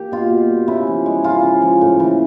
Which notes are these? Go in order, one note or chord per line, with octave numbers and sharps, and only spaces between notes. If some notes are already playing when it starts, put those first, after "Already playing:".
Already playing: A#3 G4
B2 F4
B2
G3
C#3 E4
F3
G#3
C#3 F4
C#3
F3
A2
E3